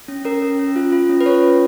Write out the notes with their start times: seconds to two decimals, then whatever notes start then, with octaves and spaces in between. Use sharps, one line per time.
0.08 C#4
0.25 C#4 A#4
0.42 C#4
0.59 C#4
0.76 F4
0.92 F4
1.09 C#4
1.21 B4
1.26 F4 C#5
1.43 C#4